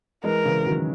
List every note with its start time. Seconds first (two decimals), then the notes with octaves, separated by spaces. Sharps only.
0.24 E3 G#3 A#4
0.45 C#3 E3
0.67 D#3 F#3